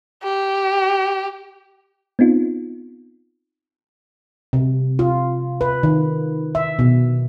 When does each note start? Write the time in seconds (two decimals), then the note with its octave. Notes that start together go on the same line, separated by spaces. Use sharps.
0.24 G4
2.19 B3 C4 D#4 F4
4.53 C3
4.99 F4
5.61 B4
5.83 D#3
6.55 E5
6.79 B2